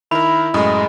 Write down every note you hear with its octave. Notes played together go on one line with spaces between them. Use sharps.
D#3 E4 A#4 B5
F#2 A2 G#3 D#6